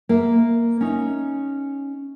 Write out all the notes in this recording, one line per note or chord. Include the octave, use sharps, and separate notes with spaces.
A#3 E5
C#4 D#4